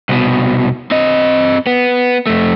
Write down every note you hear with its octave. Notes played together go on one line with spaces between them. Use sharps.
C2 B2
C4 D#5
B3
F2 A3